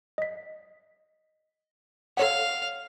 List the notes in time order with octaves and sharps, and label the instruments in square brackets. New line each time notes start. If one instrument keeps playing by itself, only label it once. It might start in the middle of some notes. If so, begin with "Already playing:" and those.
[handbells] D#5 B6
[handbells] A4 C#5 F#5 [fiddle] F5